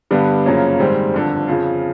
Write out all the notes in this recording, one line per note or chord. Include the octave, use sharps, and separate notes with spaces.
G2 D3 G3 B3
F#2 C#3 F3 A#3 C#4
G#2 D#3 G3 C4
G1 F2 D3
F2 C#3 F3